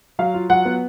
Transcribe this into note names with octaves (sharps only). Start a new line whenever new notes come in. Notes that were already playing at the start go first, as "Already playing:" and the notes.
F#3 F5
F4
F#3 F#5
B3